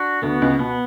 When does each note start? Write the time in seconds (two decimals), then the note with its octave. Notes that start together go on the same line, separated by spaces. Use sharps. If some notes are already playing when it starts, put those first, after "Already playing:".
Already playing: D4 F#4
0.22 D2 D3 B3
0.42 C#2 C#3
0.59 B2 B3